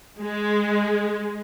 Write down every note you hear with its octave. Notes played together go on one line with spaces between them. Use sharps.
G#3